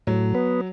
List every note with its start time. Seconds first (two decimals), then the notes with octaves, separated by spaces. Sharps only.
0.07 A2 F#3
0.35 B3